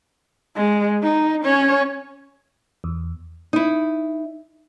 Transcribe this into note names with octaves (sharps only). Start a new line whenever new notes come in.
G#3
D#4
C#4 C#5
E2
D#4 E4